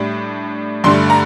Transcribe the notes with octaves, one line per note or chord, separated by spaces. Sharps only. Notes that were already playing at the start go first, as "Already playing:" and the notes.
Already playing: A2 G3 D4
G2 D3 A3 C6
A#5